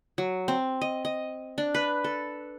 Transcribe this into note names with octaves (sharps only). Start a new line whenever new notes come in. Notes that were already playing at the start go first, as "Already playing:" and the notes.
F#3
C4
D#5
D#5
D4
B4
A4